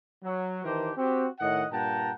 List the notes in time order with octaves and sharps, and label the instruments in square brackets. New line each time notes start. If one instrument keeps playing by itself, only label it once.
[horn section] F#3
D#3 E3 D4 G4 A#4 C5
C4 F#4 G4
A2 D#3 D#5 F#5
G2 A#2 F#5 G5 A5 A#5